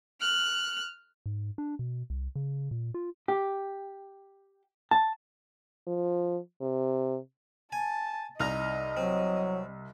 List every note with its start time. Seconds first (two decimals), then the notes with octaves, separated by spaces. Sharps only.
0.20 F6 F#6
1.26 G#2
1.58 D4
1.79 B2
2.10 C2
2.36 C#3
2.71 A#2
2.94 F4
3.28 G4
4.91 A5
5.87 F3
6.61 C3
7.72 G#5 A5
8.40 C2 D#4 D#5 A#5 F6 A#6
8.97 F#3 C4